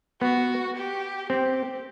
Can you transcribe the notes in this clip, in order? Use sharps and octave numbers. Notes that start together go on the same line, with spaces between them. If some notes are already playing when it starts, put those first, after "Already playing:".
B3 F#4
G4
C4 G4